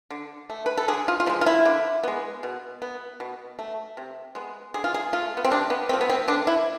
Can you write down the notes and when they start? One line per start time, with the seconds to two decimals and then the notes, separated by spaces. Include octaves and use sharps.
0.10 D3
0.50 A3
0.66 B4
0.77 A4
0.88 D3 G#4
1.08 F4
1.20 F4
1.26 F3 G#3 E4
1.41 F4
1.46 E4
1.65 D3
2.04 G#3 B3
2.43 B2
2.82 B3
3.20 B2
3.59 A3
3.97 C3
4.35 G#3 B3
4.74 D3 G#4
4.84 F4
4.94 G#4
5.13 A3 F4
5.37 B3
5.44 C4
5.51 C3 D4
5.70 B3
5.89 A3 C4
5.93 F3
6.01 B3
6.10 C4
6.28 D3 D4
6.47 E4